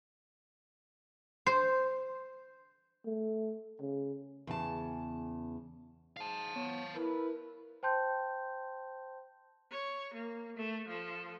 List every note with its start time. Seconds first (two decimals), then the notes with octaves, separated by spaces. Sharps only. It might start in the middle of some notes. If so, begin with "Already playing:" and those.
1.46 C5
3.05 A3
3.81 C#3
4.47 E2 C#3 A5
6.17 G#2 F5 A5
6.56 B3 C#5
6.95 E4 A#4 B4
7.83 C5 G5 A5 C6 G6
9.71 C#5
10.14 A#3
10.57 A3
10.88 F3 A4